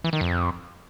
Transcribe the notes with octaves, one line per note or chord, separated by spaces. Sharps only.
E3
D#3
F2